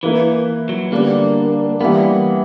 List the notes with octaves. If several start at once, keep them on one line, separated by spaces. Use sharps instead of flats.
E3 A#3 E4 B4
F#3
D3 G3 A#3 B3 D4
E3 G3 A#3 B3